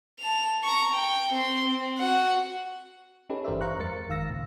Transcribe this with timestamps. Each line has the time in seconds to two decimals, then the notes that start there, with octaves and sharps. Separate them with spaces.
0.19 A5 F7
0.63 A#5 C#6
0.94 G5
1.33 C4 C6
1.64 C4
1.99 F#4 F#5
3.29 C#4 D#4 G4 A4 B4 C#5
3.44 G1 E3 A#4 C5 D5 E5
3.61 C5 F5 A#5 C#6 F#6
3.79 F2 G#3 A#4 A6 C#7
4.08 G1 D#3 F5 E6 A#6
4.30 C#2 A#2